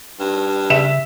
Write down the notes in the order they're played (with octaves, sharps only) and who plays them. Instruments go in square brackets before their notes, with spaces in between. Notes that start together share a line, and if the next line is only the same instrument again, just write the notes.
[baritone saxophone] G2
[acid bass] C#3 [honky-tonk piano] E5 [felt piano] E7